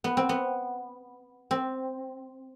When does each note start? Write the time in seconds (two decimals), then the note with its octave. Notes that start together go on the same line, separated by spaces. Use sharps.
0.04 B3
0.17 C4
0.29 B3
1.51 C4